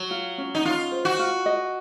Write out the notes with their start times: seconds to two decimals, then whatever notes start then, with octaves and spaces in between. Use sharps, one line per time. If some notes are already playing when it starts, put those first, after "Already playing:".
Already playing: F#3
0.11 F4
0.38 C#4
0.55 D#4
0.65 C#4 F4
0.92 C5
1.05 F#4
1.19 F4
1.46 D#5